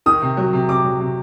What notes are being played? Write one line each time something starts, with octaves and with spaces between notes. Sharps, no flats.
D#3 D#6
C3
F#3
C3
C3 D6
F#3
C3